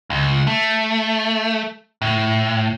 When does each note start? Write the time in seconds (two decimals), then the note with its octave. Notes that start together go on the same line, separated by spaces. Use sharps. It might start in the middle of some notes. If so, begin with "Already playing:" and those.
0.10 C#2
0.47 A3
2.02 A2